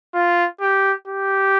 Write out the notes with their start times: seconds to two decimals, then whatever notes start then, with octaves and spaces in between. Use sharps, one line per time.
0.14 F4
0.61 G4
1.07 G4